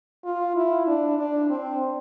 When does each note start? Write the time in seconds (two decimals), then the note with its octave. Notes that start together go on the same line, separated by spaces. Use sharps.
0.24 F4
0.56 E4
0.87 D4
1.18 D4
1.50 C4